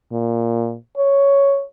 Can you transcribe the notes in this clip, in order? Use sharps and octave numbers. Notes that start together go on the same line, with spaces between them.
A#2
C#5